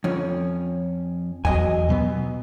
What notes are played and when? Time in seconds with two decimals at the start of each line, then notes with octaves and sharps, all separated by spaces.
0.04 F2 C#4
1.45 E2 F#3 D#5 G#5
1.89 B2 F#3 B3